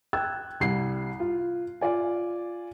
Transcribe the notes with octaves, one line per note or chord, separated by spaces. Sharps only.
G5 E6 F#6 G#6
C2 G3 C7
F4
F4 D5 G#5